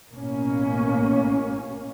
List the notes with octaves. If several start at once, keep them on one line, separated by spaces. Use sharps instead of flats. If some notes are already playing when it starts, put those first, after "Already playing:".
A1 B2 A#3 C#4